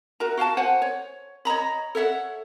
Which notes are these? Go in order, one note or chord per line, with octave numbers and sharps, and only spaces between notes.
F#4 A#4 E5 A#5
F#4 F5 G5 A5
C5 F#5 G#5
C#5
C#5 D#5 A#5 B5
A4 C#5 E5 F#5